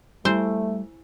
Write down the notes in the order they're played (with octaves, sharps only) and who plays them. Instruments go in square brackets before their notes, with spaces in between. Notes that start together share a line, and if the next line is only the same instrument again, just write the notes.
[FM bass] G3 [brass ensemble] A3 [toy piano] E4 G#5 E6 [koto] C5